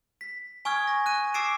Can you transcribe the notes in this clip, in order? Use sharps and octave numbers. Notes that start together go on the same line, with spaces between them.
B6
G#5 C#6 D#6 F6 G#6
A#6
F#6 D#7
D6 E6 A6 C7 D7 E7